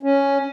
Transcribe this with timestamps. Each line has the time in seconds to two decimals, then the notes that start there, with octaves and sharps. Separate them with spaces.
0.03 C#4